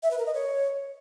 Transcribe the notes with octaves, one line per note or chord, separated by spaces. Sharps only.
E5
B4
A#4
D#5
C#5